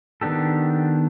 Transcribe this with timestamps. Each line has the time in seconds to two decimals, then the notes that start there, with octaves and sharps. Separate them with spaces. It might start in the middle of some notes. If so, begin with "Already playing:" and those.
0.21 D#3 B3 D4 G4 A4